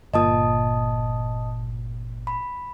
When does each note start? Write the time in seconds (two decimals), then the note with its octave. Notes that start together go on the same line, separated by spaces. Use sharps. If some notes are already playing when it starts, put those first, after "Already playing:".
0.14 G1 A#2 D#5 A5 D#6
2.27 B5